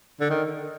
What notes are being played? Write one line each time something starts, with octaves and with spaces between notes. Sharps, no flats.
D3
D#3